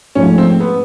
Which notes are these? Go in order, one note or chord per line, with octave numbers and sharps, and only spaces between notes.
G#2 F3 A3 C#4
C4
B3